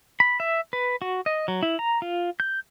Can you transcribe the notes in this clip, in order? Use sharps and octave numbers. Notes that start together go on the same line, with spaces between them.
B5
E5
B4
F#4
D#5
F#3
E4
A#5
F4
G6